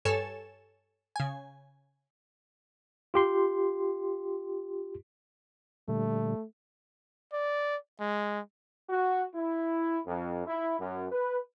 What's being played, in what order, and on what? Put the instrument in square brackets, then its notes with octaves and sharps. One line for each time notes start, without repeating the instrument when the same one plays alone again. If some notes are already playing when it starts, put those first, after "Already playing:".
[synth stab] G2 A4 C#5 G#5 E7
C#3 G#5
[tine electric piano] F4 G4 C6
[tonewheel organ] A#2 D3 G3 [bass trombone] A3
[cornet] D5
G#3
[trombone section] F#4
E4
F2
E4
F#2
B4